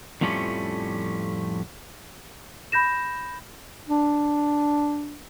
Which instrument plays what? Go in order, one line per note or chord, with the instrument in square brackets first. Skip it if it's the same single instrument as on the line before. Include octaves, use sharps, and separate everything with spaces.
[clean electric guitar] F2 A2 F3 G3 A3 C#4
[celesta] B5 G6 A#6 E7
[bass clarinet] D4